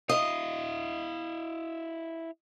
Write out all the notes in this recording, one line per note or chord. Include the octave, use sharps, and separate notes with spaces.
E4 D#5 F5